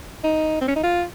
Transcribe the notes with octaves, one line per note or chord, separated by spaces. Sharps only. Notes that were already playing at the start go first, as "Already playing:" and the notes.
D#4
C4
C#4
D#4
F4